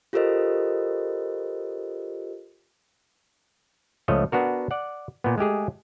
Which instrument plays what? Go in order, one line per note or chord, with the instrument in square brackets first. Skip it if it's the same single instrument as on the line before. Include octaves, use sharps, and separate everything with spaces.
[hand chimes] F4 G4 A4 A#4 C5 D#5
[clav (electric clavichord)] C#2 F3 A3 C#5 D#5
B3 D4 F#4 A#4
D5 F#5
A#2 B3
G#3 A3 G4 G#4